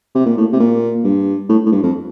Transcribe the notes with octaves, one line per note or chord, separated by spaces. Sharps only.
C3
A#2
A2
C3
A#2
G2
A2
A2
G2
F2